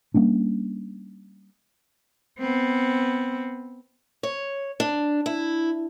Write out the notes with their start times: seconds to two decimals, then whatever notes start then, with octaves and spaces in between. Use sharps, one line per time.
0.14 G3 A#3 C#4 D4
2.39 B3 C4
4.23 C#5
4.80 D4
5.26 E4